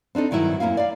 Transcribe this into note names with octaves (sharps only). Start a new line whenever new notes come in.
C4 D4 D#4 A4
G2 D#3 F#3 E4
F#2 A#3 E4 F5
D5 F5